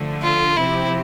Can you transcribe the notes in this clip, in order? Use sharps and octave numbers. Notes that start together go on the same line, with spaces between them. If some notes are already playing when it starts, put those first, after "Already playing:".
Already playing: D3 F3 A3
F4
C3 F3 C4 E4 G4